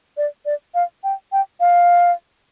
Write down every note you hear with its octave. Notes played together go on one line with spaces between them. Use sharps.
D5
D5
F5
G5
G5
F5